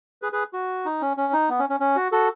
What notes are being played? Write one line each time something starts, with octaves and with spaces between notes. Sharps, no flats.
G#4 B4
G#4 B4
F#4
D#4
C#4
C#4
D#4
B3
C#4
C#4
C#4
F#4
F#4 A4